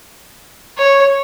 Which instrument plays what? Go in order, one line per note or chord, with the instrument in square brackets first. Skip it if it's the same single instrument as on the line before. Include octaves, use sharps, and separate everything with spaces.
[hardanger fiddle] C#5